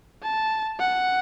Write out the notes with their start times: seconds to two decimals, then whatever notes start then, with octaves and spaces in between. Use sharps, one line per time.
0.23 A5
0.80 F#5